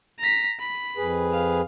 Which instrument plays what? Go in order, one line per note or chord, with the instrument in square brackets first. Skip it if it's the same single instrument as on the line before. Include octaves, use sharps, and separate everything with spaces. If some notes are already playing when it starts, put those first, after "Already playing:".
[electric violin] A#5 B6
B5
[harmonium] F2 G#4 B4
[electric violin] F5